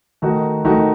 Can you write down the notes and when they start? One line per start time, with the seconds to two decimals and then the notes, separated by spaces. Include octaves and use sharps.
0.22 D#3 A3 D#4 F#4
0.65 D#3 A3 D#4 F#4